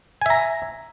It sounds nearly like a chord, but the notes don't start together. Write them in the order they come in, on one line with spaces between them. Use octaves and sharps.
G#5 E5 A#5